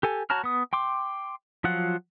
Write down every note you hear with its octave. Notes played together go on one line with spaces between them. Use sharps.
G4 A4 G#5
F#4 C#5 A5 A#5 F6
B3 D#6
G5 C6 D6
F3 F#3 F4 F#5